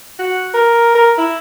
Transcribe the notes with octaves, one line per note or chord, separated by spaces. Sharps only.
F#4
A#4
A#4
E4